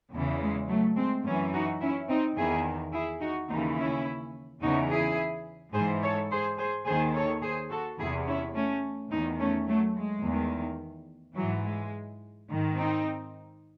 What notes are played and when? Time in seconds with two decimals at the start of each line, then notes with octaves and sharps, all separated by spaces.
0.13 E2 C#3 E3 G#3
0.41 G#3
0.69 F#3 A3
0.97 G#3 C4
1.25 F#2 A3 C#4
1.29 E3
1.53 D#4 F#4
1.81 C#4 E4
2.09 C4 D#4
2.37 E2 D#3 E4 G#4
2.93 E4 G#4
3.21 D#4 F#4
3.50 D#2 C#3 E3 C4 D#4
3.78 C#4 E4
4.62 E2 C#3 E3 D#4 F#4
4.90 E4 G#4
5.74 G#2 E3 G#4 C5
6.02 A4 C#5
6.31 G#4 C5
6.59 G#4 C5
6.86 D#2 D#3 G#4 C5
7.14 A4 C#5
7.43 G#4 C5
7.71 F#4 A4
7.99 E2 C3 E3 E4 G#4
8.26 C#4 E4
8.55 A3 C#4
9.11 E2 C4 D#4
9.15 D#3
9.39 A3 C#4
9.67 F#3 A3
9.95 G#3
10.24 E2 D#3
11.36 G#2 E3 F#3
11.64 G#3
12.48 G#2 D#3
12.76 C4 D#4